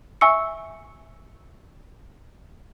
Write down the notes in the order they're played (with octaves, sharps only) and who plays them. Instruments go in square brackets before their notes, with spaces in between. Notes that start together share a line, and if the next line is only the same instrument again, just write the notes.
[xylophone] E5 G#5 C#6 E6 C#7